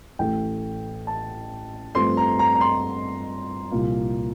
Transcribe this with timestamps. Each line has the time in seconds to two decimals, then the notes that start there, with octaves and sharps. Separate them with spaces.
0.19 A1 A2 A3 G5
1.07 A5
1.95 G2 F3 A3 C4 C6
2.17 A#5
2.39 A#5
2.55 A#5
2.61 C6
3.72 C2 A#2 F3 A#3